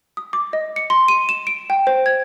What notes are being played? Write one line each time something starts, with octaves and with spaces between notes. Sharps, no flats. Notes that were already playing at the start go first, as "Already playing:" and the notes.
D#6
D6
D#5
C#7
C6
D#7
E7
D7
G5
C5
G#6